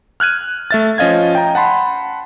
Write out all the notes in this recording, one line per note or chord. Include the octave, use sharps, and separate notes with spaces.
F6 F#6 G#6 D#7
A3 E5 A6
F3 C#4 D#5 F5 G#6
G5 A#5
F#5 A5 B5 C6